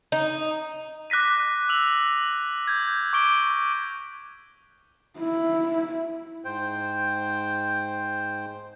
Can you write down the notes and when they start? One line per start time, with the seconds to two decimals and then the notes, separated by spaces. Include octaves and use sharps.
0.12 D#4
1.10 D6 F#6 A#6 B6 D#7
1.69 E6 F7 F#7
2.67 G6 G#6
3.13 C#6 D6 D7 G7
5.19 E4
6.45 G#2 C5 G5